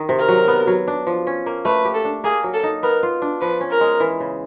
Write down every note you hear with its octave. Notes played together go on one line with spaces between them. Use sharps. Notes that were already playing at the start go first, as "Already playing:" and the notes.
Already playing: D#3 D#4
C3
A#4
F#3
B3
F#3
D4
F3
C#4
A#3
A3 B4
G4
A4
D4
A#3 G#4
F#3
A4
D#4
B3 A#4
F4
D4
F3 B4
C#4
A#4
G#3
E3
C#3